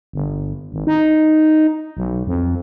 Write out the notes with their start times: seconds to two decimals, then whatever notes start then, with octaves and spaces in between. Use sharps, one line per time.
0.13 G1
0.72 G#1
0.87 D#4
1.97 B1
2.27 F2